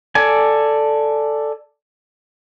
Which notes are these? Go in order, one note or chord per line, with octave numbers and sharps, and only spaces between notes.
A4 D5 G#5